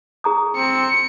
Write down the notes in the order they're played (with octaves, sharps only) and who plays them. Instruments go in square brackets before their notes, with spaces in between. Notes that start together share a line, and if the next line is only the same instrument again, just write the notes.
[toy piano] G#4 A#5 D#6
[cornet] C4 [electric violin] C#7